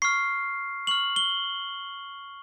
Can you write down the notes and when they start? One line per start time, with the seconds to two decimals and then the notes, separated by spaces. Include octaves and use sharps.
0.02 C#6 F6 C7
0.87 C#6 F6 F#7
1.16 G7